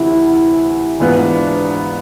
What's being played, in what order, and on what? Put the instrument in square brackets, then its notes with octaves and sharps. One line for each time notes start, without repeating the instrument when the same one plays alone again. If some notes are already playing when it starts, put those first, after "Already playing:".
Already playing: [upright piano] D2 C3 E3 [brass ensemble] E4
[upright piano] G#2 E3 B3 F4 B4 [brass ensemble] D4